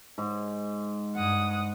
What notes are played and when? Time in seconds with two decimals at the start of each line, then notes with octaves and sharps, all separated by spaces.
0.18 G#2
1.15 G2 F#5 D#6